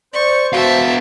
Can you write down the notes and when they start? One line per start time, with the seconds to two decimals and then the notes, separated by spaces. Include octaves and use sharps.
0.14 C5 D5 C#6
0.53 B3 F#4 E5 F5 A5